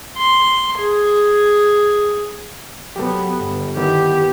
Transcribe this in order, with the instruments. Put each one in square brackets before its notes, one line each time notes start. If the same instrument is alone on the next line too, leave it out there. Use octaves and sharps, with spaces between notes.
[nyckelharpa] C6
G#4
[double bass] F#3 B3 [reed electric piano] G4 A4
[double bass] G1
[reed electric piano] D#3 B3 E4 [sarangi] G4